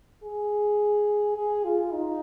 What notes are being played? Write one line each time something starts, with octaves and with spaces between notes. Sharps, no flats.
G#4
G#4
F4
D#4